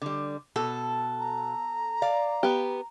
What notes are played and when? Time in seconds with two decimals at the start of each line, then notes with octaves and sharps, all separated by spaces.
0.02 D3 G3
0.56 B2 A4
1.19 A#5
2.02 D5 F5
2.43 B3 G4